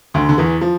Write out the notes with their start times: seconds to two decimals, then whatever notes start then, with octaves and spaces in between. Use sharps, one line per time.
0.14 D2 D3
0.29 D3
0.38 E2 E3
0.61 F3